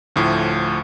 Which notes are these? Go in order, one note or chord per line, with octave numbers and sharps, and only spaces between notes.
D2 A2 F3